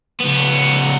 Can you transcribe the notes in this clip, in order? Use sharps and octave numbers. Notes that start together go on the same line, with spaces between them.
C#2 B3